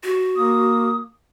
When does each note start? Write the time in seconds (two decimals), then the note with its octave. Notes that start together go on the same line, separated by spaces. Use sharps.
0.03 F#4
0.36 A#3 D#6